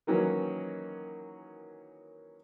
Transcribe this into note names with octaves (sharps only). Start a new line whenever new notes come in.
D#3 E3 F#3 A#3 C#4